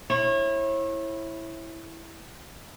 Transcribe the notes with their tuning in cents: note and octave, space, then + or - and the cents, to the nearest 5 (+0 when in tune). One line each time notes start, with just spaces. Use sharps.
E4 +0 C#5 -35